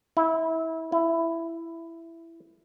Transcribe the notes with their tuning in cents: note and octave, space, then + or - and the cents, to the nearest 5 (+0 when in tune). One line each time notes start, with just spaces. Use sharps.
E4 -25
E4 +10